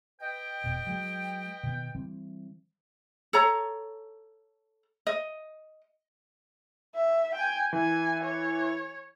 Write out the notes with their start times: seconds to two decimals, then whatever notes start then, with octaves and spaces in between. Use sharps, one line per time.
0.21 B4 D#5 G5
0.64 E1 E2 B2
0.87 F#3 G#3
1.63 B2 D#3 B3
1.95 E3 G3 C4
3.33 A4 C#5 A#5
5.07 D#5
6.95 E5
7.35 G5 G#5
7.73 E3 G#5
8.25 C#5